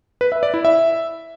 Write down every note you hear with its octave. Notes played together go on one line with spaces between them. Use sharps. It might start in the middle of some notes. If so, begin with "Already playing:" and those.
B4
E5
D5
E4
E5